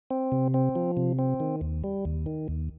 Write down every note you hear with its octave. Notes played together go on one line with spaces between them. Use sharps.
C4
C3
C4
F3
C3
C4
D#3
D#2
G3
D#2
D#3
D#2